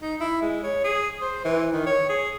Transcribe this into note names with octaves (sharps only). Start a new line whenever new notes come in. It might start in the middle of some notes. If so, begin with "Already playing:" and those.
D#4
E4
G#3
C#5
G#4
C5
E3
D#3
C#5
G#4